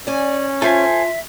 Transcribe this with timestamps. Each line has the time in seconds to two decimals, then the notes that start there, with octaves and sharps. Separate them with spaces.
0.07 C#4 D5 G#5
0.62 F4 A4 C5 E5 G#5